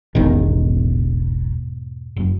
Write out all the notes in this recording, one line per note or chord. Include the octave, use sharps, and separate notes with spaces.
E1 A1 E2 G#2 B2 D#3
F#1 F#2